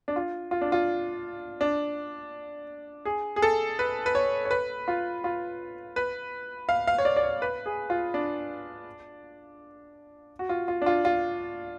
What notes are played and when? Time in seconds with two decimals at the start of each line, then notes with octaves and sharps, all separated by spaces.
0.08 D4
0.16 F4
0.51 F4
0.61 D4
0.72 F4
1.61 D4
3.05 G#4
3.36 G#4
3.42 A4
3.79 B4
4.06 B4
4.15 C#5
4.45 C#5
4.51 B4
4.88 F4
5.24 F4
5.96 B4
6.69 F5
6.87 F5
6.98 C#5
7.05 D5
7.17 D5
7.23 C#5
7.42 B4
7.66 G#4
7.90 F4
8.14 D4
10.39 F#4
10.49 F4
10.68 F4
10.82 D4
10.86 F4
11.05 F4